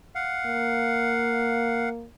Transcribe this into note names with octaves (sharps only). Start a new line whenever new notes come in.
F5 F#5
A#3